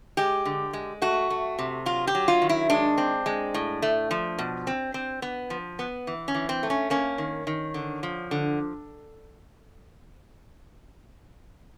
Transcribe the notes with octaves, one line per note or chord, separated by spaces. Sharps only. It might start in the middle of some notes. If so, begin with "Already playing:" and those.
G#3 G4
D3
G#3
A3 F#4
A3
C3
F#3 F4
G4
F#3
F4
D#3
E4
G#3 D4
C4
G#3
A2
A3
F3
B2
C4
C4
B3
F3
B3
E3
C#4
E3
C4
A3
C#4
A#3 C#4
D#3
D#3
D3
F3
D3